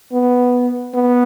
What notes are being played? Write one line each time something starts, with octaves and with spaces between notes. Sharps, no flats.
B3
B3